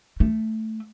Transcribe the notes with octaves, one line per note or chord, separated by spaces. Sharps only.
A3